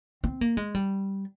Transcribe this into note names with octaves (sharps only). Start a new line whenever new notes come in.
C4
A#3
G#3
G3